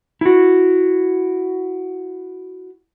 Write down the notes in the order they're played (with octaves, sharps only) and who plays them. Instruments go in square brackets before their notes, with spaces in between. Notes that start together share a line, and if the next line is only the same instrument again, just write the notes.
[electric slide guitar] E4 F#4